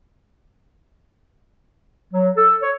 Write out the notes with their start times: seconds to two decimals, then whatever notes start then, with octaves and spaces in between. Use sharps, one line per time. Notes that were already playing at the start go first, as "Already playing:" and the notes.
2.14 F#3
2.37 A4
2.63 C#5